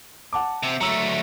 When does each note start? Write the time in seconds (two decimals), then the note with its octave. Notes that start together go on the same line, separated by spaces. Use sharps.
0.33 F#5 A5 D6
0.63 C3
0.81 F#3 A3 A#5 E6